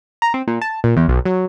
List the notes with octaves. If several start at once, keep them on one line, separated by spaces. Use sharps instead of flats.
A#5
C4
A#2
A5
A#2
E2
B1
F#3